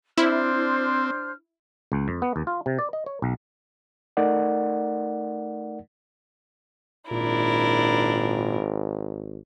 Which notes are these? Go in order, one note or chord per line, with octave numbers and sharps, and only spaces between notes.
C4 D4 E4 C5 F6
C#2
F2
B3
D#2
F4
C3
D5
D#5
C#5
B1
A3 D#4 A#4 D5 F#5
G#1 A#2 D4 E4 A#4